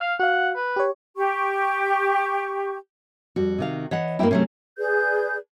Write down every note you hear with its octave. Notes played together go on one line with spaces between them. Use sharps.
F5 F6
F#4 F5 F#5
B4
G4 C#5
G4 C#6
F2 G3 F#4
C3 D#3 F5
E3 C#5 D#5 F#5
G2 F#3 A#3 D#4 E4 G5
C3 F#3 A3 C#4 A#4 C#5
G#4 B4 D5 G6